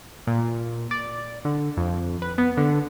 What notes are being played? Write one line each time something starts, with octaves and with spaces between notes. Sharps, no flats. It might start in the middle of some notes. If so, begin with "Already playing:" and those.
A#2
D5
D3
F2
B4
B3
D3